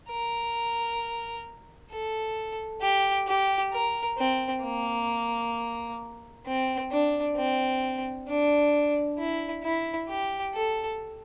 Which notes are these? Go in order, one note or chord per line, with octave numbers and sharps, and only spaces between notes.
A#4
A4
G4
G4
A#4
C4
A#3
C4
D4
C4
D4
E4
E4
G4
A4